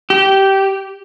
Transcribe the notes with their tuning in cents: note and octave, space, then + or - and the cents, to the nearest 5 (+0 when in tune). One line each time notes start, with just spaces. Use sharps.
G4 -15